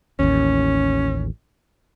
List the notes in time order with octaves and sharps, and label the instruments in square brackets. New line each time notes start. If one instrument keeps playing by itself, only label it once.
[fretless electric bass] A1 D#2 [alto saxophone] C#4